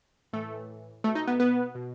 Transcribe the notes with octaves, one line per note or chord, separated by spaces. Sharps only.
A2 E3 A3 A4
B2 A3 A4
D#4 D#5
B3 B4
B3 B4
B2